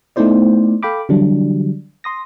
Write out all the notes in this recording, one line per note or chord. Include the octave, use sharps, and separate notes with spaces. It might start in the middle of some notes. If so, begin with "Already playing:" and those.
A3 B3 D#4 E4 C5 D5
A4 F5 G5 B5 D6
D3 E3 F#3 G3 D4
C6 D#6 A#6